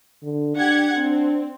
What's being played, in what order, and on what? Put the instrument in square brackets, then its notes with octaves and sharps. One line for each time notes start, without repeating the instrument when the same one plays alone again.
[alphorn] D3
[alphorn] D4 [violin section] G4 F#5 G#6
[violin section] C4 [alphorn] D4